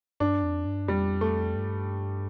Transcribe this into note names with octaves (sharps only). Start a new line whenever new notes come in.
G2 D4
F2
G2
F2 G3
A3
G2